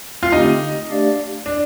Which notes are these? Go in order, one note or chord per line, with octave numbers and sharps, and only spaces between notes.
F4
D3 A3 C4 D#4 G4
A3 D4 G4 D5 F5
D4